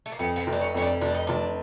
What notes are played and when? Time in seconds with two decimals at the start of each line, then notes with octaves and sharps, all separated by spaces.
0.06 A3
0.12 A#3
0.19 F2 B3
0.36 B3
0.40 C4
0.47 F1
0.53 D4
0.61 C#4
0.74 F2 C#4
0.81 D4
1.01 F1 D4
1.14 D#4
1.27 F1 D4